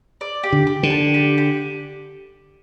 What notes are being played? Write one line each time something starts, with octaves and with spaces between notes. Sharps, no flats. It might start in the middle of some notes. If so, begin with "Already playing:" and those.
D5
G4
D3
G4
D3
A5
G4
G4